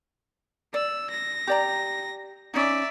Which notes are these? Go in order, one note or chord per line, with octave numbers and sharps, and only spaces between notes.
D5 E6
A#6
G4 D5 A#5
C#4 D#4 D5 E5